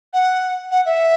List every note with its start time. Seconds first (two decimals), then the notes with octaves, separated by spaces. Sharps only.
0.13 F#5
0.71 F#5
0.86 E5